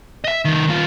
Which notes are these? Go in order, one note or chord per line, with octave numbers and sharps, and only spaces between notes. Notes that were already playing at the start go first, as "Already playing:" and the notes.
D#5 E5
C2 D#3
D#2 F4